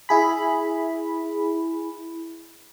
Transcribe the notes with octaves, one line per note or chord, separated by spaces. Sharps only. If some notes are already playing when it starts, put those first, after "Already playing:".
E4 G#4 B5